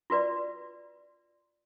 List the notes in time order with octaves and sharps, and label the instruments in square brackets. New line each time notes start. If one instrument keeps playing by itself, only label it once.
[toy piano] F4 F#4 B4 D5